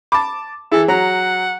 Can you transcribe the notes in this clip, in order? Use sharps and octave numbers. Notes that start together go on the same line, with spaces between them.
A5 B5 D6
E3 E4 G#4 A4
F#3 F#5 A#5